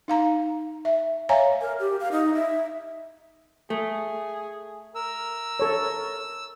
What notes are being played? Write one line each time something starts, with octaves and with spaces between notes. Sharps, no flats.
D#4 F5 A#5
E5
C#5 E5 F5 G#5 A#5
A#4
G4
F5
D#4
E5
A3 G#4
A#4 E6
A4 C#5